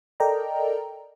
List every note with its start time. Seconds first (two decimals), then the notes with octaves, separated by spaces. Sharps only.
0.20 A4 A#4 D5 D#5 G5 A#5